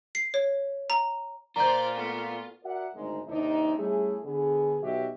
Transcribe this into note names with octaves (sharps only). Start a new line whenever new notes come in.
C7
C#5
A#5
A#2 F4 C5 D5 A#5 G6
A3 B3
F#4 A#4 D5 E5 F#5
G#1 D2 G#3 D#4
D#2 C3 D4 D#4
G3 A3 C#4 E4 G#4
D3 B3 G#4
B1 F#4 G4 B4 D#5 E5